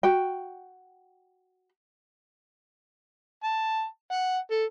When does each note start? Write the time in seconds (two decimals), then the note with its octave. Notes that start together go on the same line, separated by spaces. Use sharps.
0.03 F#4 G5
3.43 A5
4.11 F#5
4.50 A4